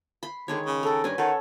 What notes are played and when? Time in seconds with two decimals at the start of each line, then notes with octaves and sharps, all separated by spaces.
0.23 B5 C6
0.48 D3 D#3 G#3 C#5
0.66 C#3
0.83 A4 A#4 G5
1.04 G2 C#4 B4 G#5
1.18 D#3 A4 C#5 F#5